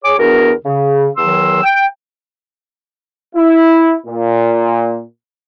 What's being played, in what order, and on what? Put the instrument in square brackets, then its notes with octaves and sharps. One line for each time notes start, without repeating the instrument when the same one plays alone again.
[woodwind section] G#4 C#5 D6
E2 B3 D4 F#4 A#4
C#3
E2 D#3 F#3 C6 E6
G5
[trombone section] E4
A#2